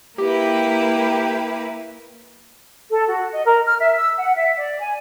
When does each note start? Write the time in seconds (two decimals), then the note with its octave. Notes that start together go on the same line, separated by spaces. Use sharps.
0.18 A#3 E4 G4 B4
2.90 A4
3.09 F#4
3.33 D#5
3.46 A#4
3.66 F6
3.79 E5
3.97 E6
4.17 F#5
4.35 E5
4.58 D5
4.79 G#5